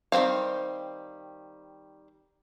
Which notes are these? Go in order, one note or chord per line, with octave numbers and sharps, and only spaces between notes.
D#3 G3 A3 C4 F5